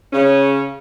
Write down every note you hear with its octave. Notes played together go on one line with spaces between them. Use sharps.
C#3 C#4